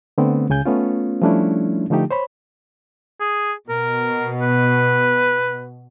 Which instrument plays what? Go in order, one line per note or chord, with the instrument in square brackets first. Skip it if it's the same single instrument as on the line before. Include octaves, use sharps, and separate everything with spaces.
[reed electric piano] D3 A3 B3 C4
C#2 C#3 G#5 G6
A3 B3 C#4 F4
F3 G3 A3 C#4 D4 E4
D3 F3 A3 D#4 G4
C5 C#5 B5
[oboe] G#4
[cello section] B2 [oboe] A#4
[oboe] B4